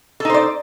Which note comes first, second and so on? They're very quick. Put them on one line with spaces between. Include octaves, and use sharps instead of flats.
A4 D#4 C5 D5